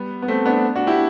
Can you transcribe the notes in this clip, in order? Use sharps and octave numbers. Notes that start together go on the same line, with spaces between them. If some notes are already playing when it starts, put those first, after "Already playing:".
Already playing: G3 B3
B3
A3 C4
B3 D4
D4 F#4
E4 G4